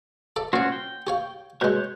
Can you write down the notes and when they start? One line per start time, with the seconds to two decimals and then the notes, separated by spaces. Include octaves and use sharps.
0.36 A4 D5 E5
0.53 A#2 C#4 F#4 C5 D5
0.72 G5
1.07 G4 C#5 F5
1.61 B2 G#3 C#5 F#6 G6